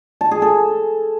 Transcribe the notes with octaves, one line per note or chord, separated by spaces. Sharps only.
A5
G#4
A4